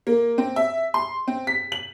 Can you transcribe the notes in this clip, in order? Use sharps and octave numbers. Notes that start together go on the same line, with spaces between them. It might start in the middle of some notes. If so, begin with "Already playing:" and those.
A#3
C4
E5
C6
C4
B6
F#7